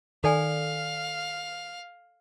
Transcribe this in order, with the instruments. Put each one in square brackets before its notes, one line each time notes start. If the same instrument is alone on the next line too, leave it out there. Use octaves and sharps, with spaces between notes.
[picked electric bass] D#3 [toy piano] A4 D5 G#5 [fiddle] F5